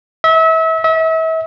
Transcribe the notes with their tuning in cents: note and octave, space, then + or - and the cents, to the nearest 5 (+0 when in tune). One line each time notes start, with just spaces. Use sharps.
E5 -30
E5 -35